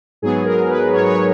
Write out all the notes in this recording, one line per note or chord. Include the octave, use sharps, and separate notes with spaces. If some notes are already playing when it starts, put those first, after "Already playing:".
G#2 F#3 B3 G#4
A#4
B4
G#2 F#3 B3 C#5
C#5